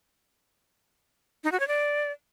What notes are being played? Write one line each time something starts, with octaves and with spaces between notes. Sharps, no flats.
D#4
F#4
C#5
D5